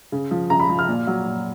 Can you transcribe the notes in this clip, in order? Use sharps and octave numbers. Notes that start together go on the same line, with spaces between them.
C#3
F3
C#3 A#5
B5
F3
F6
A#2
F#3
A#2